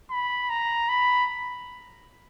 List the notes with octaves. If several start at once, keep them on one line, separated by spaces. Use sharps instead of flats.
B5
A#5
B5